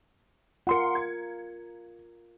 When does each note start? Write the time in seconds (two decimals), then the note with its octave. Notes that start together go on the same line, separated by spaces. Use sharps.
0.67 F4 A#4 F#5 C6 C#7
0.95 G#6